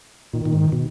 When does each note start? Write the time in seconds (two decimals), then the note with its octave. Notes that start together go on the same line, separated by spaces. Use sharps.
0.33 A#2 D#3
0.45 A#2
0.53 G#2
0.72 B2